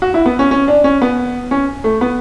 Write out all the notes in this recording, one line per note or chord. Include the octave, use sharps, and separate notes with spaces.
F#4
E4
B3
C#4
C#4
D4
C#4
B3
C#4
A3
B3